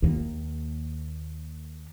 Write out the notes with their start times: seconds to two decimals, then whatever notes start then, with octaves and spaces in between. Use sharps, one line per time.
0.02 D#2 A#3